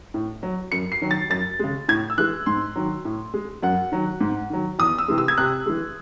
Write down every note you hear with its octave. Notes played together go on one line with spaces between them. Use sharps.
A2
F#3
F#2 C#7
C7
D#3 F#3
A6
F#2 A6
C#3 G#3
A2 G#6
E6
E3 G#3 F#6
G#2 C6
D#3 F#3
A2
G#3
F#2 F#5
D#3 F#3
G#2
D#3 F#3
E2 D#6
E6
C3 E3 G#3
E6
G#6
C3 F#6
E3 G#3